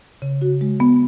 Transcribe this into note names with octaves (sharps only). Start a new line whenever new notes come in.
C#3
F#4
G#3
B3